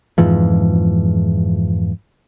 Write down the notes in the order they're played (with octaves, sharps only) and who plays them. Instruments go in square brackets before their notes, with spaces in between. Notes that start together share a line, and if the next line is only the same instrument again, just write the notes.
[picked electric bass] F2 G#2 E3 F3